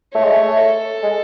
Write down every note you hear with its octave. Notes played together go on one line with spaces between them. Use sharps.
A3 C#5
G#3
A3
A4
G#3